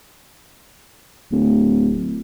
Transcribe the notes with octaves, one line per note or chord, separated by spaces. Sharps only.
D1